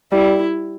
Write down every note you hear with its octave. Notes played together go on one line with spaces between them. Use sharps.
G3 E4